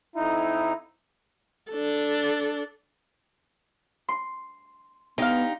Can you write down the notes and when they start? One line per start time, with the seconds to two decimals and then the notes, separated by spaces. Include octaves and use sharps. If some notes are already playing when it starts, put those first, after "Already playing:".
0.16 F2 D#4 E4
1.72 D4 A4
4.09 C6
5.18 D3 B3 D#4 G4 F5